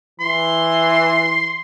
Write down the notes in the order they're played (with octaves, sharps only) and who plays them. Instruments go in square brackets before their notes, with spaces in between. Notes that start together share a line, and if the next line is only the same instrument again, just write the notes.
[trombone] E3 [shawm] C6